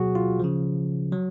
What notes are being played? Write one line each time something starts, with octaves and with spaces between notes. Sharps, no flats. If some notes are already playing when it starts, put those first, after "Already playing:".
Already playing: B2 F#3 F#4 G#4
F4
C#3 F3
F#3